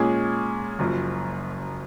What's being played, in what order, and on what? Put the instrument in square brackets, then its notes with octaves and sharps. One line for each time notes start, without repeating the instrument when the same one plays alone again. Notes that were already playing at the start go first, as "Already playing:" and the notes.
Already playing: [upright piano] A#2 G#3 C#4 G#4
F#1 F#2 F3